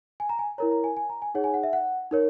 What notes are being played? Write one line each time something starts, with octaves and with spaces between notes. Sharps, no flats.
G#5
A#5
G#5
E4 A#4 C#5 A#5
A#5
G#5
G#5
A#5
G#5
D#4 G#4 C#5 F#5
G#5
F#5
E5
F#5
D#4 A#4 C#5